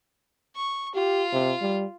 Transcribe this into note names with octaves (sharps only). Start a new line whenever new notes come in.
C#6
F4 G4
C3
G3